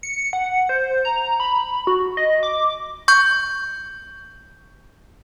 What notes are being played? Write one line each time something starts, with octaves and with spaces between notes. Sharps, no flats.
C#7
F#5
C5
A#5
B5
F#4
D#5
D6
C#6 G6